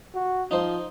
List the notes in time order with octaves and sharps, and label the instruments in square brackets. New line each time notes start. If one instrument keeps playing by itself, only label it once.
[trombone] F#4
[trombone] F3 [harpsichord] D#4 C5